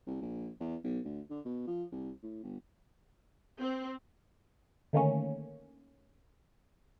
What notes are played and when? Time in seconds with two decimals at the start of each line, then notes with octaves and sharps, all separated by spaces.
0.07 C2
0.21 A#1
0.60 E2
0.84 B1
1.05 D2
1.30 D3
1.45 B2
1.67 F3
1.92 C2
2.23 A2
2.43 G1
3.60 C4
4.93 D3 D#3 A3 A#3 C#4